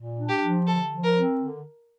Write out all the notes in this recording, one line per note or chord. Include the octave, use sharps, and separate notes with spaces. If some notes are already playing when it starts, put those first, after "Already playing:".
Already playing: A#2
D4
G4
F3
D3 A4
F3
A#4
C4
D3